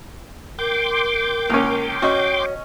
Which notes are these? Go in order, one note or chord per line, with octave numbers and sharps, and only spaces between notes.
A#4 G5 C6 D6
C#2 A#3 C#4
C#4 F#4 C#5 D#5 C#6